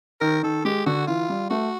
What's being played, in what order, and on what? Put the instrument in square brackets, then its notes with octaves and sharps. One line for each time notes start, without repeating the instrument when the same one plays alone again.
[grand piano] D#3 [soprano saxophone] A#4
[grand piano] D#3 [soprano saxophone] A4
[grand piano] G#3 [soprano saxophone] G4
[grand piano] D3 [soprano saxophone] F#4
[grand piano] E3 [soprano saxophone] F4
[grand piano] G3
[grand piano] A3 [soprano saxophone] F#4